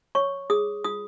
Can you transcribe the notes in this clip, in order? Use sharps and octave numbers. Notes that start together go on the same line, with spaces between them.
C#5 C#6
G#4 D#6
F4 D#6